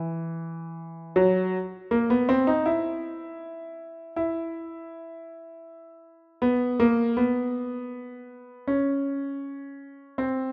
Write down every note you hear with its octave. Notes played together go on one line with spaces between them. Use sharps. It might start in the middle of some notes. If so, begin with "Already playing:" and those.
Already playing: E3
F#3
A#3
B3
C4
D#4
E4
E4
B3
A#3
B3
C#4
C4